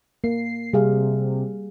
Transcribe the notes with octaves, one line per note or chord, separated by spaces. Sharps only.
A#3 C7
C3 G3 G#4 F5